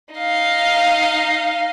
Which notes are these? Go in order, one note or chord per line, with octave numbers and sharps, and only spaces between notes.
D#4 F5